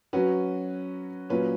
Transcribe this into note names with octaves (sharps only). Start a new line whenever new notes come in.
F#3 C#4 F#4 B4
A#2 F#3 C#4 F4 B4